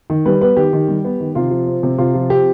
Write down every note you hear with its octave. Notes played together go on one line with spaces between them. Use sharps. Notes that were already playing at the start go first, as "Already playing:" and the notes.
D#3
G3 B4
B3 B4
D#3 G4
D#3
G3
B3
D#3
C3 F4
F3
C4
C3
C3 F4
F3
C4 G4